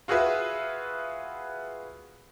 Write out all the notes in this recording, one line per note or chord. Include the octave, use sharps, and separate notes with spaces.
F4 F#4 G#4 B4 E5